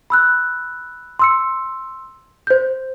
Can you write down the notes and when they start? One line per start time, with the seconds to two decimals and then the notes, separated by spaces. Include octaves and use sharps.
0.10 B5 E6 F#6
1.19 C6 E6 C#7
2.47 C5 G6